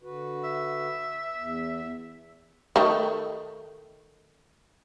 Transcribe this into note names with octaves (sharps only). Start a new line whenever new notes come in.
D3 F#4 B4
E5
E2
D#3 A3